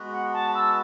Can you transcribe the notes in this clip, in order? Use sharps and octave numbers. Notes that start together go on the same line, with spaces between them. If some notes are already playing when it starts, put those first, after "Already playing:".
Already playing: G#3 B3 F#4 B4
F#5
A5
E6